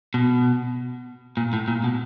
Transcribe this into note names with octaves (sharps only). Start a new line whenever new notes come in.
B2
A#2
A2
A#2
B2